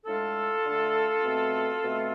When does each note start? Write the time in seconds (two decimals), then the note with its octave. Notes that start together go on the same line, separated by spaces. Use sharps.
0.06 A2 G#3 D4 F4 A4
0.64 D3 A3 D4
1.23 B2 A3 C4
1.81 B2 A3 C4